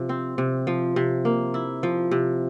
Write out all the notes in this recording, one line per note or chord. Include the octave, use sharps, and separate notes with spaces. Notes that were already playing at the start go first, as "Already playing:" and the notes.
Already playing: C3 F3
C4
C3
F3
C3
A#3
E4
F3
C3